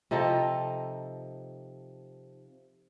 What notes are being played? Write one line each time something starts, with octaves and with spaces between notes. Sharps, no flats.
C3 F3 D#4 A4